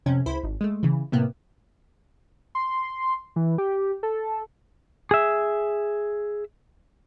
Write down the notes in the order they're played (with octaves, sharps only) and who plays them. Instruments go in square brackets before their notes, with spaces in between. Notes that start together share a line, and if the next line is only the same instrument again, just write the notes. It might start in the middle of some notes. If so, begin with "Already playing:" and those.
[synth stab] F2 C3 C#4
C#2 E4 C5 B5
G#1
G#3 A3
C#3 E3
A2 C3 A#3 B3
[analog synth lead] C6
E3
G4
A4
[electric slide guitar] G#4 E5